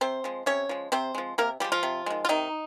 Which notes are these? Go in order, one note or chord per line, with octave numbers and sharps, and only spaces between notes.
C3 C4 C5
F3 G#3
C3 C#4 C#5
F3 G#3
C3 C4 C5
F3 G#3
C3 A#3 A#4
F3 G3 G#3 G4
F3 F4
C3
D#3 G#3
F4
C3 D#3 D#4